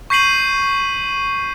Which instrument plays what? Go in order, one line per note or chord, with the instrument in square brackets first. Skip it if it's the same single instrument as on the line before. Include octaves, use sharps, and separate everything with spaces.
[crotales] C#6 G6 B6 C7 D#7 F#7